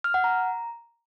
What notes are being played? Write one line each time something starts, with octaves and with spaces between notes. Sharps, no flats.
F6
F#5
A#5